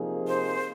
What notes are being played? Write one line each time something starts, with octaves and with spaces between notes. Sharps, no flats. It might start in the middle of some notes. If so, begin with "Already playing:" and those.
Already playing: C3 F3 A#3 D#4 G#4
C5